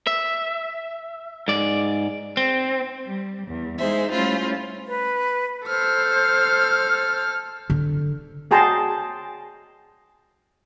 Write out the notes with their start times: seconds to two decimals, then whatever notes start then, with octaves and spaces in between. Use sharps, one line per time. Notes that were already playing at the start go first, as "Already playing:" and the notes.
0.07 E5
1.48 G#2 D5
2.37 C4
3.06 G3
3.47 E2
3.79 G#3 D#4 G#4 C5 E5
4.11 G3 A3 C#4 E4 F4 C5
4.87 B4
5.67 A4 C5 F6
7.70 D3
8.51 F#4 G#4 G5 A5 A#5 C6